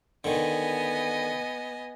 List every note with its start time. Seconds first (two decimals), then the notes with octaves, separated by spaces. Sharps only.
0.24 D3 D#3 B3 D#5 G#5